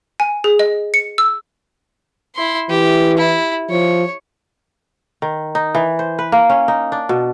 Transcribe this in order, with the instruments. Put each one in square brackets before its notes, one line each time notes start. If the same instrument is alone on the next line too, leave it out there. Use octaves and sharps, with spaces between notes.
[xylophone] G#5
G#4
D#5
C#7
E6
[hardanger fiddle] E4 C6
[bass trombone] E3 [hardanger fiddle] G4
[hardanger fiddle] E4
[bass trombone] F3 [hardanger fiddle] C#5
[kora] D#3
D#4
E3
C5
B4
A#3
C#4
D#4
D4
B2